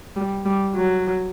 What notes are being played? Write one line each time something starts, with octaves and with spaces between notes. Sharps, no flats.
G3
G3
F#3